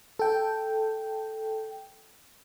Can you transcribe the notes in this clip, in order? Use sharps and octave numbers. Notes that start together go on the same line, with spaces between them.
A4 G5